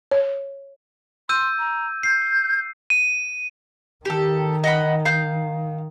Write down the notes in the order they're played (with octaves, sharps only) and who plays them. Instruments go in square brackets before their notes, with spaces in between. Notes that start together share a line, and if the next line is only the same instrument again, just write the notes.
[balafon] C#5
[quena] C6 [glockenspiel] E6 G6 D#7
[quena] A#5
[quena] G6 [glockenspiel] C7
[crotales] D#7
[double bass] D#3 [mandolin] G4 A4
[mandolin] D#5 F#5 B5
F5 G6